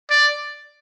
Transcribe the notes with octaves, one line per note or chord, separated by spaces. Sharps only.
D5